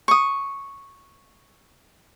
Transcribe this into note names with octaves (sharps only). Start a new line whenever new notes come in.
C#6 D#6